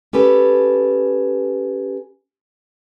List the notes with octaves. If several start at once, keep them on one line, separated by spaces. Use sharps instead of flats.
C#4 G4 A4 B4